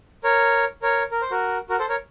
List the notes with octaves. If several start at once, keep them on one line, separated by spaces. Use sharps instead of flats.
A#4 C#5
A#4 C#5
A#4
C5
F#4 A#4
F#4 A#4
A4 C5
A#4 C#5